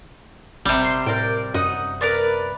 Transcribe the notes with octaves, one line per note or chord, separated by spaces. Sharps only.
G#1 C3 G3
G5 C6
A2 A#4 D5 G5
F#2 D#4 F#5 D#6
A#4 B4 D5